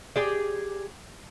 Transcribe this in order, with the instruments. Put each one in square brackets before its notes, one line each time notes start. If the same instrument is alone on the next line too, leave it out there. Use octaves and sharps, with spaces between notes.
[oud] G4 G#4 D5